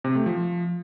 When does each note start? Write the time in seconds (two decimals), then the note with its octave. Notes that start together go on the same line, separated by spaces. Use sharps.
0.04 C3
0.15 A3
0.26 F3